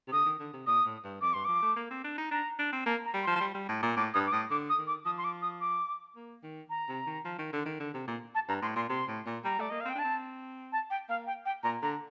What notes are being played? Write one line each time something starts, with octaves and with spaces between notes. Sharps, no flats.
C3
D3 D#6
D#3
D3
C3
A#2 D#6
A2
G2
F2 D6
G2 C6
F3 D6
A3
A#3
C4
D4
D#4
D4 A#5
D4
C4
A#3 A5
A#5
G3
F3 C6
F3
G3
G3
A2
A#2
A2 D6
G2 D#6
D6
A2 D#6
D3 D6
D#6
D#3
D6
F3 D#6
C6
D6
D#6
D6
A#3
D#3
A#5
C3
D#3
F3
D#3
D3
D#3
D3
C3
A#2
A5
G2 A#5
A2 C6
A#2 C6
C3 C6
A2
A#2
G3 A#5
A3 D5
A#3 D#5
F5
C4 G5
D4 A5
C4
A5
G5
A#3 F5
G5
G5
A#2 A#5
D3 A#5